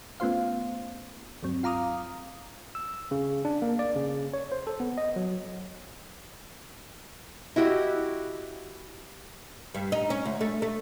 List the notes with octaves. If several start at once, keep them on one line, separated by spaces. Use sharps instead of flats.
A3 B3 C#4 F4 C5 F5
D2 G2 F#3 C4
F4 F5 A#5 D6 D#6 F6
E6
C#3
D4
A#3
D5
C#3
C#5
C5
A4
B3
D#5
F#3
E4 F#4 G4 D#5
G2
D#4
C#4
D2
A3
A3